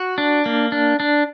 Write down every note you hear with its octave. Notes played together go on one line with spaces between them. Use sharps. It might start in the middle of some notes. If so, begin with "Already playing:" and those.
Already playing: F#4
D4
A#3
D4
D4